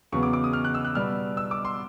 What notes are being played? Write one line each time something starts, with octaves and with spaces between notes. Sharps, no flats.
E2 C#3 F#3 B3 C#6
D6
D6
D#6
F6
F#6
E6
F#6
B2 G3 B3 F6
E6
D6
C6